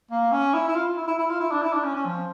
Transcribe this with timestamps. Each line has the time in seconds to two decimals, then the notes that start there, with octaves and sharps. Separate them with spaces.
0.11 A#3
0.32 C#4
0.54 E4
0.68 E4
0.75 F4
0.97 E4
1.08 E4
1.19 E4
1.30 F4
1.41 E4
1.51 D4
1.62 E4
1.73 D4
1.84 C#4
1.95 C#4
2.06 F3